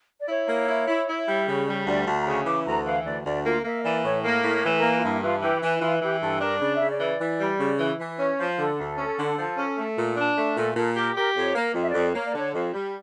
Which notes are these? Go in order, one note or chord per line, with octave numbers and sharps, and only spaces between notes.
D5
E4 C#5
A#3
E4
E4
E4
G3
C#3
G3
D2 D5
D2 A5
A#5
C#3 C#6
E3 D6
D2 A#5
E3 F5
D2 D5
D2 D5
A#3 F4
A#3 E5
E3 D5
A2 C#5
A#3 A#4
A2
C#5
E3
A#4
A#3
F4
G2 E4
E3 F4
E3 G4
E3 E4
E3 F4
E3 G4
G2 A4
D4 A#4
C#3 D5
E5
C#3
D5
E3
E3
G3
C#3
E3
E3
C#4 C#5
F3
D3 A4
D2
C#4
D3
F3
C#4
A3
A#2
D4
A3
A#2 A4
A#2 A4
G4 A#4
G4 A#4
F2 C#5
A#3
F2
E5
D5
F2
A#3 C#5
D5
D3 C#5
F2
G3